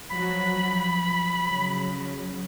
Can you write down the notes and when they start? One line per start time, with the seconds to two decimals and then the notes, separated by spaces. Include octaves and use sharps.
0.11 F3 F#3 F#4 B5
0.56 F3
1.44 C#3 F#3